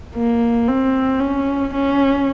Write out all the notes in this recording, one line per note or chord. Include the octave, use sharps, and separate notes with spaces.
A#3
C4
C#4
C#4